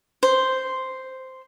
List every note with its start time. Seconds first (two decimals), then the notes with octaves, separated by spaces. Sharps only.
0.23 C5